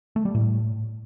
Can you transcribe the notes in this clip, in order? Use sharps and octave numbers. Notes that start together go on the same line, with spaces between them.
A3
G3
A2